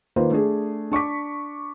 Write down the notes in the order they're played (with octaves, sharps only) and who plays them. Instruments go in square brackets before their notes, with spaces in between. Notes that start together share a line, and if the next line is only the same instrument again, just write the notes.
[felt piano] D#3 A#3 F4 B4 C5
A3 D4 G#4
D4 C#6 D6 B6